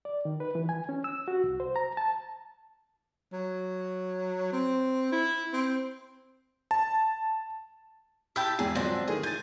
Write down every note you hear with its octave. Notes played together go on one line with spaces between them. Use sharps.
D5
D#3
B4
E3
G#5
C#4
E6
F#4
C2
C5
A#5
A5
F#3
C4
E4
C4
A5
E4 G4 A5 E6
E2 G#2 G#4
G#2 D3 F3 F#3 C4
D#3 E3 A3 G#4
G#5 G6 A6